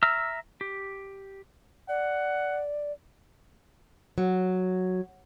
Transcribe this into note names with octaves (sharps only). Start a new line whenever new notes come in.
E5 A#5 E6 F6
G4
D5 F#5
F#3